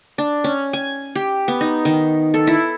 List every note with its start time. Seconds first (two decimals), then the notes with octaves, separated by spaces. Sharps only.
0.18 D4
0.44 C#4
0.73 G#5
1.16 G4
1.48 B3
1.61 D#4
1.85 D#3
2.34 A4
2.47 E4